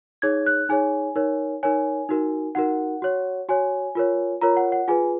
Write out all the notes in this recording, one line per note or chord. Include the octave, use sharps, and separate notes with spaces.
D#4 G#4 C#5 G#6
F#6
D#4 G#4 C#5 G#5
D#4 A#4 C#5
D#4 A#4 C#5 G#5
D#4 F#4 A#4
D#4 F#4 A#4 F#5
F#4 C#5
F#4 C#5 G#5
F4 A#4 C#5
F4 A#4 C#5 A#5
F#5
F#5
F4 G#4 B4 G#5